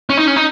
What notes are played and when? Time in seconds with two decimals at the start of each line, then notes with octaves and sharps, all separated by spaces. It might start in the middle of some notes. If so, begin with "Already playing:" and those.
0.10 C#4
0.17 D#4
0.27 C#4
0.36 D#4